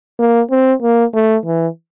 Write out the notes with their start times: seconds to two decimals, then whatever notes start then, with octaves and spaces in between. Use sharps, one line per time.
0.19 A#3
0.51 C4
0.83 A#3
1.14 A3
1.46 E3